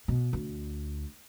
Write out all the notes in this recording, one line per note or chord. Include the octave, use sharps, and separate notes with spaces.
B2
D2